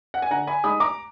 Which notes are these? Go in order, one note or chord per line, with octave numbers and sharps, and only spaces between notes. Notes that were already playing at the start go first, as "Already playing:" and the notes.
F#5
G#5
D3 F#5 A#5
G#5 B5
G#3 D#4 B5 D#6
A#5 D6